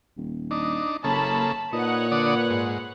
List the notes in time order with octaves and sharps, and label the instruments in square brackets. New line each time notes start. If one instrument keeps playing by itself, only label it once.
[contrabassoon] D#1
[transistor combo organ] D4 D#4
[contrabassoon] F#1 [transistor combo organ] C#3 A#3 A4 [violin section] A5 B5
[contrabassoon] A#2 [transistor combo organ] D#4 [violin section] B4 C#5 F#5
[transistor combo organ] D3 D5 D#6
G#2